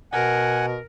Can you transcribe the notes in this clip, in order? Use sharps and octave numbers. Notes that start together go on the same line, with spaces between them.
B2 A#4 F#5 G#5